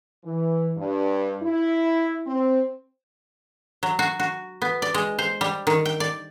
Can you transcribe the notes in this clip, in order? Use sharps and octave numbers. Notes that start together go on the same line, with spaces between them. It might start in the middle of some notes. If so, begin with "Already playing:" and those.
E3
G2
E4
C4
F#3
F#4
F#4
B3
D5
G#3
C5
G3
D#3
G5
D5